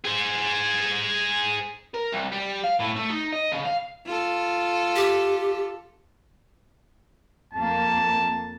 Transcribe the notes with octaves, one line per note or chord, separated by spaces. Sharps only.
G#4 C5
A#4
C2
G3
F5
A2
A3
D#4
D#5
C#3
F5
F4 A4
G4
F2 A#3 A5